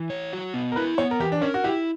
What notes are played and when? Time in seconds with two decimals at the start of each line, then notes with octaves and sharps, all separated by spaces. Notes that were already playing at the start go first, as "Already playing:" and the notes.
Already playing: E3
0.10 C#5
0.33 F#4
0.54 B3
0.72 A#4
0.76 E4 B4
0.98 B3 C#5
1.11 A#4
1.20 E3 G4
1.32 D4
1.41 C#4 A#4
1.54 F#4
1.64 E4 G4